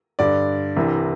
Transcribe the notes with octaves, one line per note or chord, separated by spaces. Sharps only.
G2 D3 D5
C2 C3 E3